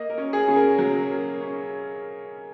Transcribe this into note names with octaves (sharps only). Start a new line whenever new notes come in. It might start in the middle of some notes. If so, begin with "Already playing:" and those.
Already playing: A#3 D#5
A#4
C#4
G#4
C#3
A#4
F#3 A#4
A#3
C#4